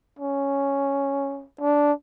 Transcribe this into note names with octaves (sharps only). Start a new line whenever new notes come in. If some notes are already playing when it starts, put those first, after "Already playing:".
C#4
D4